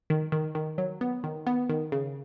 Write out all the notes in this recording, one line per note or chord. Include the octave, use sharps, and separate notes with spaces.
D#3
D#3
D#3
F#3
B3
D#3
B3
D#3
C#3